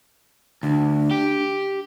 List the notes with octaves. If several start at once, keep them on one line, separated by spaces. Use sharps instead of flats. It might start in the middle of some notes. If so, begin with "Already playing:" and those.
D2 D4
G4